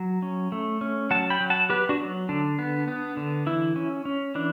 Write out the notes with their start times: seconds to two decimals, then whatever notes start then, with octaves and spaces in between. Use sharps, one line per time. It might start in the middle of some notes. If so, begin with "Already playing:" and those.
Already playing: F#3
0.22 C#4
0.52 A3
0.81 C#4
1.11 F#3 F#5 A5
1.30 G5 B5
1.41 F#3
1.50 F#5 A5
1.69 B3 G4 B4
1.89 D4 F#4
1.99 F#3
2.29 D3 D4
2.59 B3
2.88 B3
3.17 D3
3.46 E3 E4
3.76 C#4
4.05 C#4
4.35 E3 D4